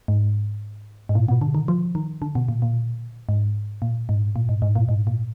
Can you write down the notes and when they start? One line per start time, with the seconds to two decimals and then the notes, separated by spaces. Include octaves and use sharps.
0.08 G#2
1.09 G#2
1.15 A#2
1.28 B2
1.41 D3
1.55 D#3
1.68 F3
1.95 D#3
2.22 D3
2.35 B2
2.48 A#2
2.62 A#2
3.29 G#2
3.82 A#2
4.09 G#2
4.36 A#2
4.49 G#2
4.62 G#2
4.75 A#2
4.89 G#2
5.07 A#2